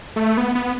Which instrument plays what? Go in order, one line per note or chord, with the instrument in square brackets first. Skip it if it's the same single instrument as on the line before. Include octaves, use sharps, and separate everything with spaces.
[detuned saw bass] A3
B3
B3